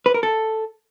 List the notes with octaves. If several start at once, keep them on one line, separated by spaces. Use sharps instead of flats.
B4
A#4
A4